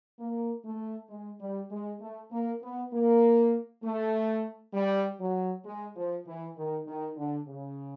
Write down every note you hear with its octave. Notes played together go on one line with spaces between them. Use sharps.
A#3
A3
G#3
G3
G#3
A3
A#3
B3
A#3
A3
G3
F#3
G#3
F3
E3
D#3
D#3
D3
C#3